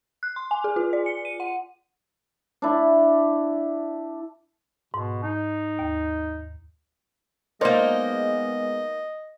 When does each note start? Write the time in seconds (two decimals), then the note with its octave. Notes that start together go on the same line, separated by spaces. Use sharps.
0.23 F#6
0.36 C6
0.51 G#5
0.64 G#4
0.76 F4
0.93 D5
1.06 C#7
1.25 D#7
1.40 F#5
2.62 D4 E4
4.94 G#2 B2
5.23 D#4
5.79 D#2
7.61 G#3 A#3 B3 D#4 A#4 C5 D5 D#5